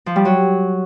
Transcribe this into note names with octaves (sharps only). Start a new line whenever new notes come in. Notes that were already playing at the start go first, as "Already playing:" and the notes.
F3
G3
F#3